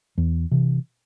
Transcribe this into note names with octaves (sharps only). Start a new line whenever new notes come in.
E2
C3 E3